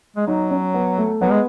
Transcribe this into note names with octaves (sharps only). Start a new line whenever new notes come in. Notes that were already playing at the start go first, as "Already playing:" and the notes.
G#3
F#3 D#4
C#4
B3
A3
F#3 B3
G#3